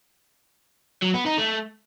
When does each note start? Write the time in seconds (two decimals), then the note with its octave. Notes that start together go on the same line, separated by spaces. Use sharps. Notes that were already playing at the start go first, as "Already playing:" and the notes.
1.02 F#3
1.14 B3
1.26 D#4
1.38 A3